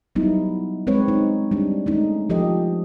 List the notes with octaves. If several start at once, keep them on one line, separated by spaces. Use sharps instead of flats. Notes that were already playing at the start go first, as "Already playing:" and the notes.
F#3 G3 B3 D#4 E4
G#3 C4 B4 C#5
D#4
G3 D4
G#3 A3 C#4 D#4
F3 G4 A4 D#5